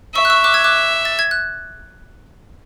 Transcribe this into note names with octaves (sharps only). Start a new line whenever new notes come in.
E5 C#6 E6
F#6
C#6 E6
D6 F#6
E6 G#6
D6 F#6
A6
G#6
F#6